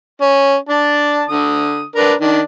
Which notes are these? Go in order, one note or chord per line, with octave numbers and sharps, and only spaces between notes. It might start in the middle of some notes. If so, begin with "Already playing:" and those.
C#4
D4 A5
D3 D#6
D4 A#4 B4
D#3 D4